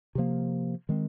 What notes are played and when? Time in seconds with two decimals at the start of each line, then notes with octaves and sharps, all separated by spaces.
0.15 C3 F3 A#3
0.89 D#3 G#3 C4